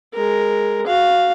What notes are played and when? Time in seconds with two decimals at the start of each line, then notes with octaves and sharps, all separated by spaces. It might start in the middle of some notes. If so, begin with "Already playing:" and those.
0.14 G#3 A#4
0.87 F#4 F5